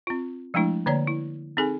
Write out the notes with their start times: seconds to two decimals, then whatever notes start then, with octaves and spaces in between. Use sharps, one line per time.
0.07 C4 F4
0.54 F3 G#3 A3 D4 E4
0.86 D3 A#3 C#5 D5 A#5
1.07 E4
1.57 C4 D#4 G#4 A4 G#5